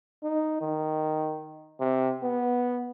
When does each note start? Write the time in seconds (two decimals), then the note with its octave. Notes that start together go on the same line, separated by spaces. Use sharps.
0.23 D#4
0.61 D#3
1.80 C3
2.23 B3